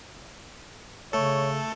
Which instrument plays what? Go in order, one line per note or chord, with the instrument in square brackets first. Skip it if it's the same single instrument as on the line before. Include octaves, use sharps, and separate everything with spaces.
[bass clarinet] C#3 [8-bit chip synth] A3 A4 [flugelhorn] C#5